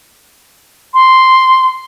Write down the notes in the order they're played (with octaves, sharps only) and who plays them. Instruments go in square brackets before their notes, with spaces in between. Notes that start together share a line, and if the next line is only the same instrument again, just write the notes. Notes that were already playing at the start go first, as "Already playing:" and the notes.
[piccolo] C6